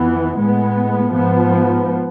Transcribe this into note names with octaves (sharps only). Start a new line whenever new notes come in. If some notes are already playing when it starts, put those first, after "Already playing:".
Already playing: F2 E3 B3
A2 G#3 B3
G#2 F3 B3